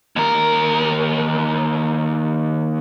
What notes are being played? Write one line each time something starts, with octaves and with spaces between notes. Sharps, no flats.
D#2 A#4